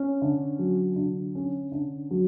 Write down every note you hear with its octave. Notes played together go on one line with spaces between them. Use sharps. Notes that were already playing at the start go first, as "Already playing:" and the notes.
Already playing: C#4
D3
F#3
D3
C#4
D3
F#3